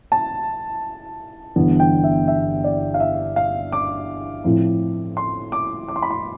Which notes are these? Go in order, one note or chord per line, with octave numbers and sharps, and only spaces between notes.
A5
G1 G2 E3 B3 D4
G5
E5
E5
D5
F5
E5
F5
D6
A2 F3 C4 E4
C6
D6
D6
C6
B5
C6